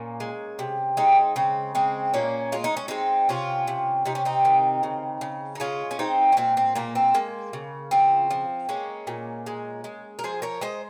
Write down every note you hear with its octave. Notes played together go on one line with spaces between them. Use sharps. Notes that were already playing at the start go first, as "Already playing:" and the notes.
Already playing: A#2 A#3 C#4
G#3
C3
G#3 C4 D#4
C#3 C4
G#3 C4
A#2 A#3 C#4
G#3 F4
D#4
C#4
G#3 C4 D#4
C3 C#4 F4
C3
C3 D#4
C#4
C4 D#4
D#3
C#3
C#3
D#4
G#3 C#4 F4
C#4
G#3 C4 D#4
C#4
A#2 C4
C4
A#2 A#3
C4
G#3 A#3
C#3
F3 C4
F3
G#3 A#3 C#4
A#2
G#3
G#3
A#4
F3 G#4 C5
A#4 C#5
G#3 C5 D#5